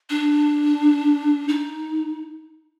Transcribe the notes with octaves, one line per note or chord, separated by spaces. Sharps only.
D4
D#4